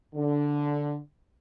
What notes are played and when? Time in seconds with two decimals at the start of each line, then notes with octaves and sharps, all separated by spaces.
0.15 D3